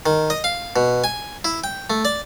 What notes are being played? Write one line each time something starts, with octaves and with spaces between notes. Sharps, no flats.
D#3
D#5
F5
B2
G#5
E4
G5
A3
D5